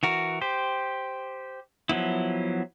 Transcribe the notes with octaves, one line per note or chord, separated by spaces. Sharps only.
E3 F#4 A#4
G4 C5
F3 F#3 B3 E4